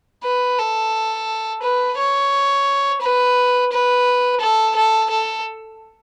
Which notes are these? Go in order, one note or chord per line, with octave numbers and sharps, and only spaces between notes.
B4
A4
B4
C#5
B4
B4
A4
A4
A4